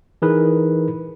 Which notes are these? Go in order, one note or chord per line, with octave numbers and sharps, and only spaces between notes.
E3 D#4 G#4 A#4 B4